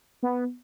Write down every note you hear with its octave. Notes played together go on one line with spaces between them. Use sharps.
B3